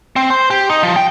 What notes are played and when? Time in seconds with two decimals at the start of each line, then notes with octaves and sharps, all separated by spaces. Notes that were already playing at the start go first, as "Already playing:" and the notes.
0.16 C4
0.30 C5
0.50 G4
0.69 D#4
0.83 F3
0.96 G5